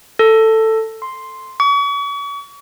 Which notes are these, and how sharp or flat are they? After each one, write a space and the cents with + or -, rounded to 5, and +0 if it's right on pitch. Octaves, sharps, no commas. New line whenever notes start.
A4 +10
C6 +0
C#6 +40